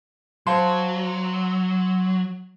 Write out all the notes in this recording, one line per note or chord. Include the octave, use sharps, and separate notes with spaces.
F#3 C5 F5 A5 C6